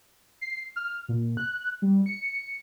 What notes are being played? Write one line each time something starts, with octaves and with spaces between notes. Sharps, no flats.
C7
F6
A#2
F#6
G3
C#7